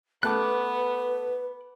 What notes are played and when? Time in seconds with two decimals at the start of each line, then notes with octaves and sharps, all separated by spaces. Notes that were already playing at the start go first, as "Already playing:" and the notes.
0.23 A3 B3 A4 B4 A5 D6 F#6